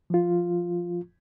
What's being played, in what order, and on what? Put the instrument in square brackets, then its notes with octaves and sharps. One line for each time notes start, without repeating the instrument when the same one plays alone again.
[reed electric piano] F3 F4